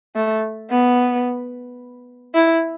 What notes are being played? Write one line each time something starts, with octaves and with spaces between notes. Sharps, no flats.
A3
B3
E4